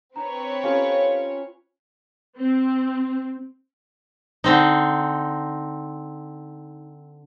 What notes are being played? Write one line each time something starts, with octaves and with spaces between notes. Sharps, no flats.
C4 D4 B4 C#5 A#5
C#4 F4 G4 A4 F5 A#5
C4
D3 C4 D#4